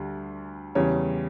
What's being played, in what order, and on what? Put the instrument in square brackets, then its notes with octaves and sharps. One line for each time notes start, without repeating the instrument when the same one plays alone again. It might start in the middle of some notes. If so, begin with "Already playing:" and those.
Already playing: [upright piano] D2 D3 G3
E2 C#3 G3 C#5